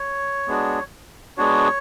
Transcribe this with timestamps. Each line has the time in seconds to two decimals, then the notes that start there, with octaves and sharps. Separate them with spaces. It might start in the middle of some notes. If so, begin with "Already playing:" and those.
Already playing: C#5
0.48 G#3 B3 D4 F#4
1.37 G#3 B3 D4 F#4 C#5